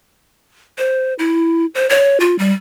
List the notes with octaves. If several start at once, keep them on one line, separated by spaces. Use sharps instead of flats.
C5
E4
C5
C#5
F4
G3